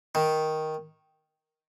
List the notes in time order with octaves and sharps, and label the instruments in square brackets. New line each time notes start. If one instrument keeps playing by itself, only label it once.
[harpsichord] D#3